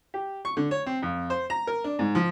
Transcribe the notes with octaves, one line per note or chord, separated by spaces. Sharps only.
G4
C#6
D3
C#5
C4
F2
C5
A#5
A#4
D4
G#2
F3